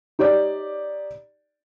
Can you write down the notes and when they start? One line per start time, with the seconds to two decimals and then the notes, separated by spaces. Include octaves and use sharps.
0.19 D#4 G4 C#5 D5